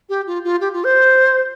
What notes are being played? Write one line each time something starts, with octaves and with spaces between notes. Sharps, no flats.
G4
F4
F4
G4
F4
C5